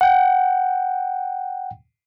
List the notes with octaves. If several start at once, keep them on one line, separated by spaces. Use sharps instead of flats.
F#5 G5